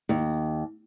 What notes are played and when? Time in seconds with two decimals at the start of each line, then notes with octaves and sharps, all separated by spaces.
0.09 D#2